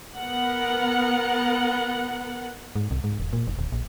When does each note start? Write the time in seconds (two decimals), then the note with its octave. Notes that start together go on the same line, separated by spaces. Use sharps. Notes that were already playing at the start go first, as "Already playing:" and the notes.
0.18 B3 A#4 F#5
2.76 G#2
2.91 C2
3.04 G#2
3.20 E1
3.33 A#2
3.47 F1
3.59 D1
3.72 A#1